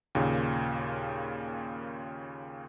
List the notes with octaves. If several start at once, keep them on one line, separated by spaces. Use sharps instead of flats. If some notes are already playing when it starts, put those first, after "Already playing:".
D#2 A#2 C#3